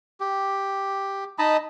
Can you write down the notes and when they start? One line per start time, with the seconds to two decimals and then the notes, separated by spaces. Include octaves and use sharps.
0.20 G4
1.39 D#4 D#5 A5 B5